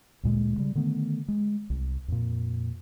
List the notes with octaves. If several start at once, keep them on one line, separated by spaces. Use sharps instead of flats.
D2 A#2 G#3
C#3 G3
D3 D#3 A3 B3
G#3
C2
F2 A#2